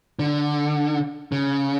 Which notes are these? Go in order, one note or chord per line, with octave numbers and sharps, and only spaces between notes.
D3
C#3